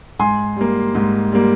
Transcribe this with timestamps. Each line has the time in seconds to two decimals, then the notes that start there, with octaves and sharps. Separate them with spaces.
0.19 G#2 G#5 C6
0.56 G3 A#3
0.95 G#2
1.32 G3 A#3